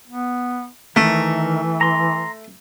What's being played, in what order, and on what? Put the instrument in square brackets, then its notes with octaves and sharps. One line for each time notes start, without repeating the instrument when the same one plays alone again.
[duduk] B3
[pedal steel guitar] D#3 A#4 [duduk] E3 [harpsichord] A3
[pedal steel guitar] A#5 C6